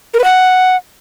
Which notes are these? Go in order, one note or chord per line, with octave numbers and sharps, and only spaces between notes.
A#4
B4
F#5